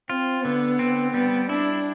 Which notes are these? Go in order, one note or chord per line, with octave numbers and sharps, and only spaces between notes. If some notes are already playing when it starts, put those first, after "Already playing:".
C4 F4
D3 B3
C4
G3 B3
D4 E4